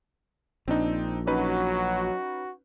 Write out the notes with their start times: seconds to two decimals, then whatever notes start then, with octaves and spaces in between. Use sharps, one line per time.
0.68 A#1 C4 D4 D#4
1.27 F#3 C#4 D#4 F#4 B4